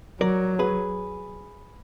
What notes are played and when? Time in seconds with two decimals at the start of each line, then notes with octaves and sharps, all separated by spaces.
0.21 F#3 A#4 D5
0.59 G#4 B4